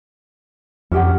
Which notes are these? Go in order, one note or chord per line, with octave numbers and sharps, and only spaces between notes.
F2 C#4 G4 F#5